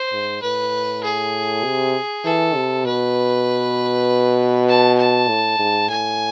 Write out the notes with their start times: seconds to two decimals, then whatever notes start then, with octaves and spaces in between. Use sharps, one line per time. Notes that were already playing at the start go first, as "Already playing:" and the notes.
Already playing: C5
0.12 G#2
0.42 A2 B4
1.03 G#4
1.64 C3
2.24 E3 A4
2.55 C3
2.85 B2 B4
4.68 A5
4.98 A5
5.28 A2
5.59 G#2
5.89 A2 G#5